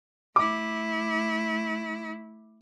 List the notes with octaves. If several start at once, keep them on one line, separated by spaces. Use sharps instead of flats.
A3 E4 D6